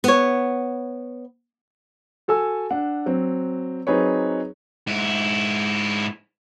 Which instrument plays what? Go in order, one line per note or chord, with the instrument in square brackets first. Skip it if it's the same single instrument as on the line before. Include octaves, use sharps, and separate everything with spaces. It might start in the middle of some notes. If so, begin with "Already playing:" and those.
[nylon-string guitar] B3 C#5
[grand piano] F#4 A4 G#5 E6
D4 F#5
F#3 C4
F#3 C4 D#4 G#4 B4 C#5
[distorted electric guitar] G#2 E4